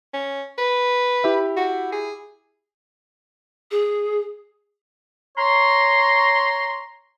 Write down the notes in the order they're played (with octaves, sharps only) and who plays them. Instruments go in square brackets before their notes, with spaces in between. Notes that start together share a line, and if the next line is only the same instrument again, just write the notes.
[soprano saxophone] C#4
B4
[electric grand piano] E4 G4 E5
[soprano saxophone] F#4
G#4
[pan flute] G#4
[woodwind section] C#5 A#5 C6